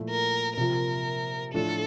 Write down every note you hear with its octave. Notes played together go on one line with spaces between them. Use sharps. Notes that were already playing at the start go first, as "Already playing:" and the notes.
Already playing: A#2 F3 A3 E4
A#4
C3 F3 A#3 F4 A#4
A2 F3 A3 D4 F4 A4